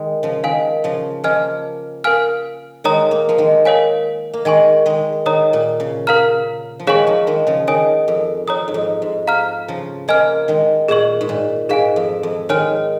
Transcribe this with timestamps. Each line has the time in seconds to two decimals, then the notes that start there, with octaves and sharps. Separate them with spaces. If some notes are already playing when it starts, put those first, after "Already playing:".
Already playing: D#3 G#3
0.23 C#3 F3
0.44 D#3 A#4 F5 G#5
0.84 C#3 F3
1.24 F3 A#3 D#5 G#5 F6
2.04 A#4 F5 G#5 F6
2.84 D#3 G#3 C#5 A#5 D#6
3.11 A#3
3.29 F3 A#3
3.38 D#3 G#3
3.65 A#4 C#5 F5 G#5
4.33 A#3
4.45 D#3 G#3 D#5 G#5 C#6
4.86 D#3 G#3
5.26 D#3 C#5 A#5 D#6
5.53 A#2
5.80 C#3
6.07 A#4 F5 A#5 F6
6.79 F3
6.87 D#3 G#3 G#4 C#5 F5 G#5 C#6
7.07 F3 A#3
7.27 D#3 G#3
7.47 C#3 F3
7.67 D#3 C#5 G#5 D#6
8.08 F2
8.47 F2 C#5 A#5 D#6
8.68 G#2
8.74 F2
9.02 G#2
9.27 F5 A#5 F6
9.68 C#3 F3
10.08 F3 A#3 D#5 G#5 F6
10.48 D#3 G#3
10.88 A#2 G#4 D#5 C#6
11.21 G#2
11.29 A#2
11.69 G#2 G#4 F5 G#5
11.96 F2
12.23 F2
12.49 D#3 G#3 C#5 G#5 F6